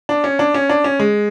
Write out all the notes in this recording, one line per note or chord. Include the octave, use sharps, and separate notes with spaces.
D4
C#4
D4
C#4
D4
C#4
G#3